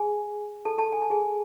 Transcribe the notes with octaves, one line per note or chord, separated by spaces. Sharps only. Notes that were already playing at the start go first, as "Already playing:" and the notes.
Already playing: G#4 G#5
A4 A5
A4 A5
G#5
A5
G#4 G#5